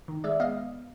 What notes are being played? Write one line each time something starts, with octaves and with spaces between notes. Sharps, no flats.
D#3
G#3 D5 E5
B3 D#5 F5